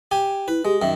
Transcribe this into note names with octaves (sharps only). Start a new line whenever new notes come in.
G4 G#5
E4 B4
G#3 G4
F#2 D#3 E5